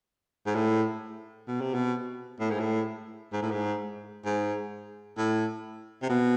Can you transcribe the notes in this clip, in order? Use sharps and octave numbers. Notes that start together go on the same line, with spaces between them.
G#2
A2
B2
C3
B2
A2
G#2
A2
G#2
A2
G#2
G#2
A2
C3
B2